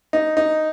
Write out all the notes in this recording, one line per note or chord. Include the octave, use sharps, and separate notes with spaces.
D#4
D#4